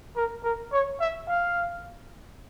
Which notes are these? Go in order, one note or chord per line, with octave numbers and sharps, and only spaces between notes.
A#4
A#4
C#5
E5
F5